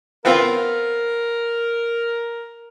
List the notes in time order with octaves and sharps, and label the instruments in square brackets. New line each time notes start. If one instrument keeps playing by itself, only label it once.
[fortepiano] B3 C4 F4 [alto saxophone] A#4